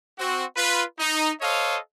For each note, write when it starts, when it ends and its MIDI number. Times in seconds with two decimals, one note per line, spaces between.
0.19 0.43 60
0.19 0.43 66
0.56 0.83 65
0.56 0.83 71
0.98 1.31 63
1.41 1.77 69
1.41 1.77 72
1.41 1.77 73
1.41 1.77 75
1.41 1.77 77